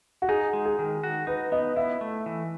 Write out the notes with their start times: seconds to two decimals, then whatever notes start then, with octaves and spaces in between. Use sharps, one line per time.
0.22 F#4
0.29 D#4 G#4
0.53 G#3
0.65 G#4
0.79 D#3
1.03 F#4
1.27 D#4 B4
1.52 B3 D#5
1.76 E4 E5
2.01 A3
2.26 E3